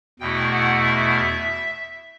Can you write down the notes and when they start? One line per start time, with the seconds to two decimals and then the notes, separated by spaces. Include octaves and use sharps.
0.20 E2 B2 A3 E4 G5
0.51 F#5
0.83 E5